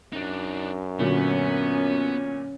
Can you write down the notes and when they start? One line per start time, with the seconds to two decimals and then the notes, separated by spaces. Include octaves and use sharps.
0.13 F#2 D4 D#4
0.99 A#2 D3 F#3 B3 C#4